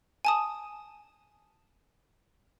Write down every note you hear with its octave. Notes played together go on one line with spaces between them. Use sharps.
G#5 A5 D#6